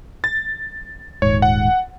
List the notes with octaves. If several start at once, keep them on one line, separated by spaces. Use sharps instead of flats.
A6
D#1 G#2 C#5
F#5